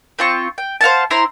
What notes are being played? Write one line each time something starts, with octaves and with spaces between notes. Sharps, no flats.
C4 F4 C#6
G5
C5 F5 F#5 A5
E4 C5 A#5 C6